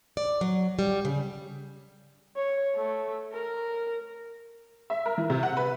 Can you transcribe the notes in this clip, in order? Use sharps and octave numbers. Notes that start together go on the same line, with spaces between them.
D5
F#3
G3
C#3
C#5
A3
A#4
E5
A#4
E3
C3
F#5
B4